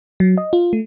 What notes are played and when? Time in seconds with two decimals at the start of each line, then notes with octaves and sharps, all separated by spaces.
0.20 F#3
0.38 D#5
0.53 F4
0.73 A3